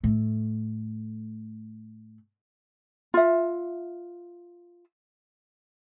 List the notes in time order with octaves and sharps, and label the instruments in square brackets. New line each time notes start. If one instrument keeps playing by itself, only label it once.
[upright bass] A2 A3
[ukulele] F4 E5